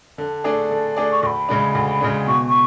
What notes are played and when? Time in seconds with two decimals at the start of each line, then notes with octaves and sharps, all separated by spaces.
0.18 D3 A5
0.44 A3 D4 G#4 D5
0.71 D3
0.96 A3 D4 G#4 D5
1.11 C#6
1.23 D2 B5 C#6
1.49 C#3 G#3 D4
1.75 D2
2.01 C#3 G#3 D4
2.27 B2 C#6
2.49 C#6